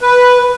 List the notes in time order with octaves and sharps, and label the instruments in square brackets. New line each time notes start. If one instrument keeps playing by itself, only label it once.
[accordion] B4